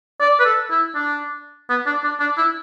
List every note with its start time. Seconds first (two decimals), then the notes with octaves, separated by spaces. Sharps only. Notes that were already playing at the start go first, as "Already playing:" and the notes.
0.20 D5
0.39 B4
0.45 A4
0.70 E4
0.95 D4
1.70 B3
1.86 D4
2.04 D4
2.20 D4
2.38 E4